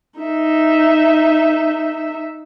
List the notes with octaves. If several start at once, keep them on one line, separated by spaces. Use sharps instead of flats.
D#4 E5